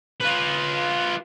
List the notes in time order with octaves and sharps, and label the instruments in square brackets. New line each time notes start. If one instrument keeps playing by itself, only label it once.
[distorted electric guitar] F4 B4